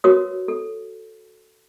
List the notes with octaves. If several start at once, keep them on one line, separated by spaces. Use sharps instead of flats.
F#4 A#4 B4 C#5 D#6
A4